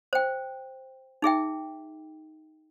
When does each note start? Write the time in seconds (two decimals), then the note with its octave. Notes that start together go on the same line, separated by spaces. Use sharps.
0.13 C5 G5
1.22 D#4 G#4 E5 G5